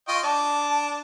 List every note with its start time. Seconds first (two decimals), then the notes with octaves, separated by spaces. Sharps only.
0.08 F4 D#5 G5 C#6
0.23 D4 A5 D6